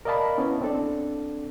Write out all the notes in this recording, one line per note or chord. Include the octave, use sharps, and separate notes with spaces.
A#4 D5 D#5 F5 A5 B5
B3 C#4 E4
C4 D4 A4 D5